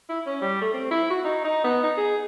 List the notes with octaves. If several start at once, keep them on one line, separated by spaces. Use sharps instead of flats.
E4
C#4
G3
A3
C4
E4
F#4
D#4
D#4
B3
D#4
G#4